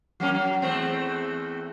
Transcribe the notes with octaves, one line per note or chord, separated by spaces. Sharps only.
F#3 A#3 C#4
F#3
E2 A3 C4